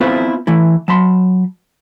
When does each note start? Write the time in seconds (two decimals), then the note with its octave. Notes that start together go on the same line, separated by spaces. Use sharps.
0.01 B3 C4 E4 F4 B4 C5
0.47 E3 A3 E4
0.88 F#3 A5 B5 C6